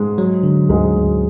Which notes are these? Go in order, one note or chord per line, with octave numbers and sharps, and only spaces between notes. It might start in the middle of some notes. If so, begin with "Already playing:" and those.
Already playing: G#2 G#3
F#3
D3
D2 G#2 G#3
D2